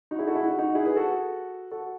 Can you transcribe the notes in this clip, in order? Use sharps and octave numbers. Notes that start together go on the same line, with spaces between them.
D#4 F#4
E4 G#4
F#4 A4
E4 G#4
D#4 F#4
D#4 F#4
E4 G#4
G#4 B4
F#4 A4
F#4 A4